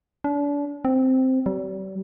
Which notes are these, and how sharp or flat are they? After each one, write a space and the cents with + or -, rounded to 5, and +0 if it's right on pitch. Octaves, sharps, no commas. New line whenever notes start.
D4 -35
C4 -5
G3 -40